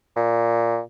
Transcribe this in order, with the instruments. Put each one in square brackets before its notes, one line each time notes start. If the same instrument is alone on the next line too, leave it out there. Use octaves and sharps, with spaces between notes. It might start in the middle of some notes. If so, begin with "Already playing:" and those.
[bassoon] A#2